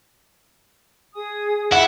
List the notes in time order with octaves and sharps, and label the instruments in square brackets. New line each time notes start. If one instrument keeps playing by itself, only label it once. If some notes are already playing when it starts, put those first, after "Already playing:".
[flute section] G#4 G#5 D#6
[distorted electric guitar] E4 [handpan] F#5